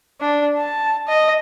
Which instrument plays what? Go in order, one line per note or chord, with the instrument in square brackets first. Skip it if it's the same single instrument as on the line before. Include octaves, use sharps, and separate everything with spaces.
[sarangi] D4
A5
D#5